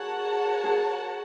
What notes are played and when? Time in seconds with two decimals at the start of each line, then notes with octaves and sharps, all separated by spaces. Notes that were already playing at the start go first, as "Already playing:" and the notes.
Already playing: F#4 G#4 A#4 C#5 F#5 A5
0.64 G#4